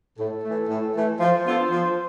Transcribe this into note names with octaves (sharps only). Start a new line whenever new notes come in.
A2 A4
E3 A3
A2
E3 A3
F3 C5
B3 D4 F4 A4
F3